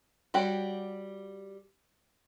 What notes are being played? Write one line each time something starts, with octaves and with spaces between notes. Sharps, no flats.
G3 F#4 G4 C#5